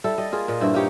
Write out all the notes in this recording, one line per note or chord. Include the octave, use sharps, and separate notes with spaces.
G3 E4 A4
G3 D#5
A#3 F4 G#4
A#2 D#5
G2 E4 C5
A#3 D#4 G4 C#5